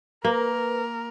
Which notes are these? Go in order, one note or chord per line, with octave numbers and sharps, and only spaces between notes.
A#3 A#4 B4